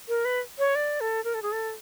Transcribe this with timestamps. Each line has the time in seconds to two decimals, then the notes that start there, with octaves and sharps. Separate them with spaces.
0.09 A#4
0.25 B4
0.59 C#5
0.75 D5
1.01 A4
1.24 A#4
1.34 A4
1.42 G#4
1.52 A4